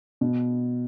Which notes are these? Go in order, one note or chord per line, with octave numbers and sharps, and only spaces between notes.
B2